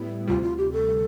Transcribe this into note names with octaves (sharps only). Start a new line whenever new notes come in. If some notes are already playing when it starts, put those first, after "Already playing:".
Already playing: A2 G3 B3 E4
D2 C3 G3 F4
F4
G4
A4